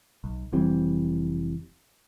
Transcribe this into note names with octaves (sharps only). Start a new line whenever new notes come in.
B1
F1 E3 G3 C4